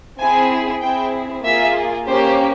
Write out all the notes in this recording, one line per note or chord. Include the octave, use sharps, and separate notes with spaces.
C4 E4 G#4 G#5
C4 E4 G#4 G5
A#3 F4 G#4 E5
A#3 C#4 G4 C5